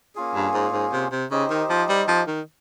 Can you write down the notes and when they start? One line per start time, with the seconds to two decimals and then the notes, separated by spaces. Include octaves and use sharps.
0.15 A#3 C#4 F4 G#4
0.35 G2
0.54 G#2
0.73 G#2
0.92 C3
1.12 C3
1.31 C#3 D#4 G4 C5 D#5
1.50 D#3
1.70 F3
1.89 G3
2.08 F3
2.27 D#3